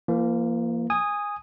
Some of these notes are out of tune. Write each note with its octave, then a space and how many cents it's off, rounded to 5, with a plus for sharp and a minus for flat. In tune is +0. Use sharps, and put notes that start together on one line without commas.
F3 -45 A#3 +0
G#5 -15 D#6 +0